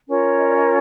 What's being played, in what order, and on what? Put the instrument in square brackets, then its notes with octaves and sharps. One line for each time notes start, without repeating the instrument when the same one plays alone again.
[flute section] C#4 F4 A#4 C#5
D#5
D5
D#5